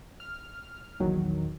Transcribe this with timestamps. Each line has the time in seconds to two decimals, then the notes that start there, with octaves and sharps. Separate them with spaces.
0.20 F6
1.00 A#1 E2 D#3 F#3